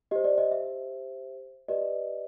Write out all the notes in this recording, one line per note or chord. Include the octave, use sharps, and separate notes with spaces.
G4 C5 D#5
D5
D#5
E5
G4 B4 D5 D#5